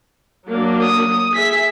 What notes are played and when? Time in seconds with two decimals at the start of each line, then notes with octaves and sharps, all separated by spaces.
0.50 F#3 A#3 D4
0.81 D#6
1.35 G#4 E5 B6